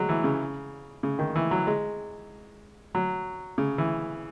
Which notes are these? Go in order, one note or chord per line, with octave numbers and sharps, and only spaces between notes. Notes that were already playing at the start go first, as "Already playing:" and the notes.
Already playing: F#3 G#3
E3
C#3
C#3
D#3
E3
F#3
G#3
F#3
C#3
E3